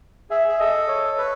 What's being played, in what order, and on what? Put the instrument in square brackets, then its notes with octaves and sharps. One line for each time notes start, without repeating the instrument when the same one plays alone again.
[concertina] G#4 [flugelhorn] E5
[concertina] G#4
[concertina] A4 [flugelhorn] D#5
[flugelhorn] C#5
[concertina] B4